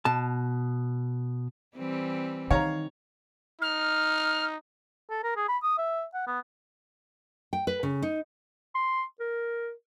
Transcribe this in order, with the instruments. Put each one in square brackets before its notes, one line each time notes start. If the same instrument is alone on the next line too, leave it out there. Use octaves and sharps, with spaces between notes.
[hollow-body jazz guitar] B2 A5
[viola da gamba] E3 G3 C4
[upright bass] D#3 [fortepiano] C#5 F5 A#5
[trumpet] D#4 [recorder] F6
[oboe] A4
A#4
G#4
B5
D#6
E5
F#5
B3
[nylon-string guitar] G5
B4
C#3
D#4
[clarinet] C6
A#4